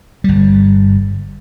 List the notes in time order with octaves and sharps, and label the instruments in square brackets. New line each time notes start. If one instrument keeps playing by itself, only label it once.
[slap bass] G1 G3